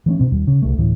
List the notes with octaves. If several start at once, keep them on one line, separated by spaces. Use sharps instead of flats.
E3 A3 C#4
B2 C4
D#2 G3
C#3
C2 A3
D1 A2 E3